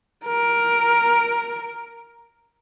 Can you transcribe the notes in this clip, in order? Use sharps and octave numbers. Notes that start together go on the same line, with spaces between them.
A#4